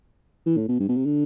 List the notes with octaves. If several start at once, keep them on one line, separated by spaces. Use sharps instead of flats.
E3
A2
B2
G2
B2
C3
D3